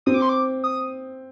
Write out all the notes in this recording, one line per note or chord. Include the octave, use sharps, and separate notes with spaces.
C4 D#6
D6
C6
D6
D#6